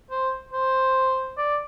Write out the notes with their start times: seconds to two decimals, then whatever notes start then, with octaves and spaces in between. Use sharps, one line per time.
0.11 C5
0.53 C5
1.37 D5